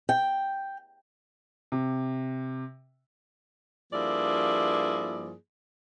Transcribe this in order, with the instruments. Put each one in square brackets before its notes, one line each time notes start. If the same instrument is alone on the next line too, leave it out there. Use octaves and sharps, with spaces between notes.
[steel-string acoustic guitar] G5
[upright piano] C3
[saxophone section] G2 F3 A#3 E4 G#4 D5